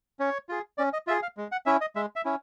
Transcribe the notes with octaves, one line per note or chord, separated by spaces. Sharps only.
C#4 C#5
F4 G#4
C#4 D5
D#5
F4 G#4 E5
F5
G#3
F#5
C#4 E4 E5
D#5
G#3 E5
E5
C#4 E4